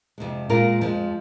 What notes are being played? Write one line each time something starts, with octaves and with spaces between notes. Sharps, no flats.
F2 C3 G#3
A#2 G#3 F4 A#4
F2 F3 G#3